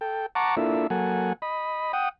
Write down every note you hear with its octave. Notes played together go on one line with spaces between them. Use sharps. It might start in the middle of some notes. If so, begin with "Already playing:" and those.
A4 G5
F#5 A5 A#5 C#6 D6
A#3 D4 E4 F4 A4 E5
F#3 A#3 A4 F#5 G#5
D#5 B5
F#5 G5 D#6